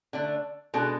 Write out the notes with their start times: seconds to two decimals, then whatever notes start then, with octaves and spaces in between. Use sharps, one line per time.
0.13 D3 A3 D4
0.74 B2 G#3 D4 A4